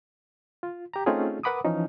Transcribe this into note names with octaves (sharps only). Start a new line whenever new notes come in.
F4
G4 A#5
A3 C4 C#4 D#4 F4 G#4
A#4 B4 F#5 B5 D6 D#6
E3 F3 C#4 D#4